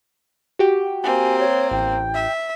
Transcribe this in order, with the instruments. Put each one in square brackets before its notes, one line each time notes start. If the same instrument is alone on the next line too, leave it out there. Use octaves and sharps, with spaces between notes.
[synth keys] F#4 G4 G5
[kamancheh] A#3 C4 [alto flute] G#5
[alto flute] C#5
[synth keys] A1 [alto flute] G5
[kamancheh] E5